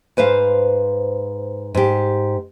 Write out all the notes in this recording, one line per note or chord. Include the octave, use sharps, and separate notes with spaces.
G#2 B4 C5 F5
G#2 G4